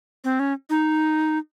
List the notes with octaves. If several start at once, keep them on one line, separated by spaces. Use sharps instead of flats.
C4
C#4
D#4